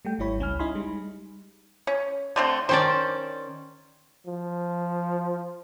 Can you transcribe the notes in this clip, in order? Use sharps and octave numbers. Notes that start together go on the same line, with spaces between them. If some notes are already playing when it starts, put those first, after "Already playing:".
G3 A3 G5
G#1 G3 E4 C#5 B5
C#2 C#4 G#5 F6
D#4 E4 D#5 G#5 B5 C6
G3 G#3 D#4
C#4
D3 A3 C4
D#3 C#4 D4 C5 D5
F3